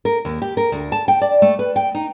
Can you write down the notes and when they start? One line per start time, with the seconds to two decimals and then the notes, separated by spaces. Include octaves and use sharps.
0.05 A#4
0.25 D#2
0.42 G4
0.57 A#4
0.72 D2
0.92 A5
1.08 G5
1.21 D5
1.42 A3
1.59 B4
1.76 G5
1.95 D#4